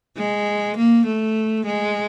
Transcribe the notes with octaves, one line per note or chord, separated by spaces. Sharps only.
G#3
A#3
A3
G#3